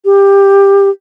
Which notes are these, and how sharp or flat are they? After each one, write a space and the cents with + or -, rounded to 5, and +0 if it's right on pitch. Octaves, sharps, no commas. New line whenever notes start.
G4 +15